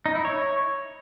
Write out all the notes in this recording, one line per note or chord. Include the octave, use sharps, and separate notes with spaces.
D#4
E4
C#5